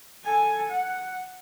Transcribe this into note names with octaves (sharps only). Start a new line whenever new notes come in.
A4 G#5
F#5